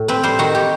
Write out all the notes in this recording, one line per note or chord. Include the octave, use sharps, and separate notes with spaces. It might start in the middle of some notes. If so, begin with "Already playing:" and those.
Already playing: A2
C4 B4
G3 C5
D#3 F#4
G4